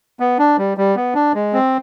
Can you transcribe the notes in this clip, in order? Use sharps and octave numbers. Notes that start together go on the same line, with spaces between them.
B3
D4
G3
G3
B3
D4
G#3
C4